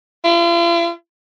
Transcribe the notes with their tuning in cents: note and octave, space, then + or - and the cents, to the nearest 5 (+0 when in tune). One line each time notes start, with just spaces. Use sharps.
F4 -45